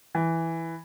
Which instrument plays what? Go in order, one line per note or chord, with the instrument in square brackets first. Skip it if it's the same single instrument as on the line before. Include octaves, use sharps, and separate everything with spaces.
[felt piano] E3